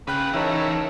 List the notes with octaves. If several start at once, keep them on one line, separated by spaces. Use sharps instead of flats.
C#3 C4 B4 G5 F#6
E3 D#4 E4 A4 A#4 C#5 E5